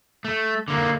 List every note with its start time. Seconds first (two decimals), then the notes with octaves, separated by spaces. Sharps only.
0.25 A3
0.68 D3 A#3